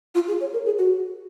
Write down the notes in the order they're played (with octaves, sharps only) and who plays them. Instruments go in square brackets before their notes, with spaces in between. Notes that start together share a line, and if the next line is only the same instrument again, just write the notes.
[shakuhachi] F4
G#4
C#5
A#4
G#4
F#4